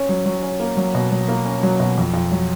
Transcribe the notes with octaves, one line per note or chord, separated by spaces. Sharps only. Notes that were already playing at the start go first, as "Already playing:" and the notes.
Already playing: C#4
F#3
F#3
C#4
A#3
F#3
B2
F#3
A#3
C#4
F#3
B2
F2
F2
F#3